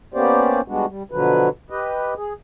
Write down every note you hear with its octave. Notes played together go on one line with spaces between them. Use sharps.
A#3 B3 C#4 G4 C5 D5
G3 G#3 B3 D4 F#4
G3
B2 D3 F3 F#3 B4
G4 B4 D#5
G#4